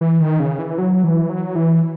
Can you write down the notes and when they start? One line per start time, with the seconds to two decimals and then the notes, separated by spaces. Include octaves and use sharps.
0.01 E3
0.20 D#3
0.40 C#3
0.59 E3
0.78 F#3
1.04 E3
1.30 F#3
1.56 E3